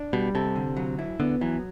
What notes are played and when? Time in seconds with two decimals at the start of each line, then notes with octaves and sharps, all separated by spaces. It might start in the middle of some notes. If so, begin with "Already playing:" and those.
Already playing: D4
0.13 B2 G3
0.35 C3 A4
0.56 D3
0.76 F#3
0.99 E4
1.20 D3 B3
1.41 E3 F#3